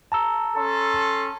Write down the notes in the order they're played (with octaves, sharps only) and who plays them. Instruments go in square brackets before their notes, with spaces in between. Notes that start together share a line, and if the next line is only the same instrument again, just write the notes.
[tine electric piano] A5 A#5 E6
[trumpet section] C#4 A4 C6